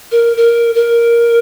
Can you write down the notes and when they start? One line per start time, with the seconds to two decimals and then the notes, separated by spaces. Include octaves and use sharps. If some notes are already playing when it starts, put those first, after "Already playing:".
0.12 A#4
0.37 A#4
0.75 A#4